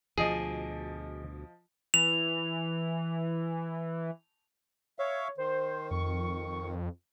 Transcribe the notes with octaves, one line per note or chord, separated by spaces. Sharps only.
D2 B2 F3 G#4 D#5
E3 F7
C#5 E5 F5
D#3 C5
F2 C#6